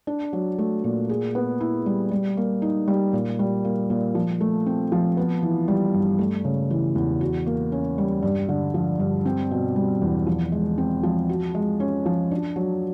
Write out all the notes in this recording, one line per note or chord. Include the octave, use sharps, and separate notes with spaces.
D4
F#3
A3
A#2
G#4
B3
E4
G3
G3
A#3
D#4
G3
A#2
G3
A#3
A#2
F3
A3
C4
F3
B3
E3
G3
G2
A3
C#3
E3
E2
F#4
A#3
C#4
G3
G2
D3
F3
G2
C4
B2
G3
E2
F3
G#3
C4
F3
F#4
G#3
C#4
F3
D4
F#3